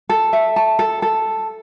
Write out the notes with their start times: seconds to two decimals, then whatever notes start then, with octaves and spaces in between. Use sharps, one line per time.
0.09 A4
0.33 E5
0.56 A5
0.79 A4
1.02 A4